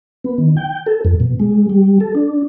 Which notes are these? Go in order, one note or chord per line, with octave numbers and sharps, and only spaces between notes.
B3
D#3
G5
A4
F2
B2
G#3
G3
A4
D4